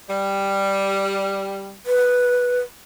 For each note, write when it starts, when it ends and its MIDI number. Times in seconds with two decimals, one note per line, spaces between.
0.09 1.75 55
1.86 2.60 71